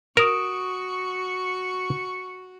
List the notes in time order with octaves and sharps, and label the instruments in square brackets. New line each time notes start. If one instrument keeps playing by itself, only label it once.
[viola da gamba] F#4 [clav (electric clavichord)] A#4 [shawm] C#6 [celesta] D#6 D7 E7